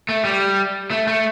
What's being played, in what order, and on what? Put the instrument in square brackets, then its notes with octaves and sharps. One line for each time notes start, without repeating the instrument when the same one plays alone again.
[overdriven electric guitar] A3
G3
A3
A3